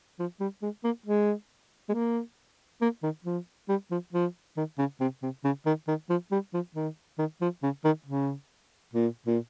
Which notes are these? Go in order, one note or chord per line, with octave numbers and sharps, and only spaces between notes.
F3
G3
G#3
A#3
G#3
G#3
A#3
A#3
D#3
F3
G3
F3
F3
D#3
C#3
C3
C3
C#3
D#3
D#3
F3
G3
F3
D#3
D#3
F3
C#3
D#3
C#3
A#2
A#2